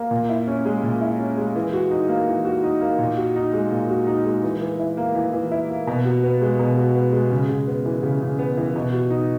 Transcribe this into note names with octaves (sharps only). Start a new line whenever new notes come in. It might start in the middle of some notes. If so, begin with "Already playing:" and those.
Already playing: A#3
A#2
E4
C#4
G#3
A#2
E4
C#4
G#3
E3
F#4
D#4
A#3
E3
F#4
D#4
A#3
A#2
F#4
D#4
G#3
A#2
F#4
D#4
G#3
E3
E3
E4
A#3
E3
E3
E4
A#3
B2
F#4
B3
G#3
B2
F#4
B3
G#3
C#3
C#3
B3
E3
C#3
C#3
B3
E3
B2
F#4
D#4